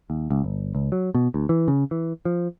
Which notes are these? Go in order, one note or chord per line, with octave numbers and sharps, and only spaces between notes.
D#2
C#2
G1
C#2
F#3
B2
D2
E3
C#3
E3
F3